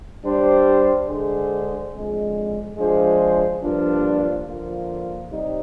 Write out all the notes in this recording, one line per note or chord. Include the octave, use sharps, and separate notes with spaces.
G3 D4 G4 C5
D3 G#3 D4 G#4 C5
F2 D3 G#3
F3 G#3 D4 G#4 C5
G2 F3 A#3 D4 F4
D3 F3 A#3 F4
C3 G3 C4 D#4